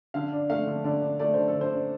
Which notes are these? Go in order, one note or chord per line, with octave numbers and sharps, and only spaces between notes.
D3 F5
D4
A3 F5
D3
D3 D5
D4
A3 D5
D3 C5
A4
D3
C5
D4